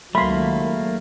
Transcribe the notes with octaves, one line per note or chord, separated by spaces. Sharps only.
C#2 D#3 F#3 A3 A#3 B5 C6